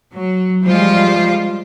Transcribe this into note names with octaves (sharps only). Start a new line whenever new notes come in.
F#3
F3 G3 G#3 F4 C5